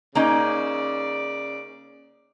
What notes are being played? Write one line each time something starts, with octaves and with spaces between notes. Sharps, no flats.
C#3 A#3 C#4 D#4 D5